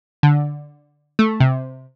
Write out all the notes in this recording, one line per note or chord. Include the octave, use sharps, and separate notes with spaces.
D3
A3
C3